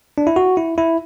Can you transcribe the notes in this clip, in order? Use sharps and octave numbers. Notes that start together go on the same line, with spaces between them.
D4
E4
F#4
E4
E4